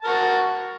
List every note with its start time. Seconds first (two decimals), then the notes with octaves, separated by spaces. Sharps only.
0.02 A5
0.04 A#4
0.07 F#4